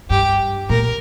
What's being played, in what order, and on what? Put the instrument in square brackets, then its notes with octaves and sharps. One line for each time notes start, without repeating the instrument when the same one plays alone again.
[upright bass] G2 [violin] G4
[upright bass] A#2 [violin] A#4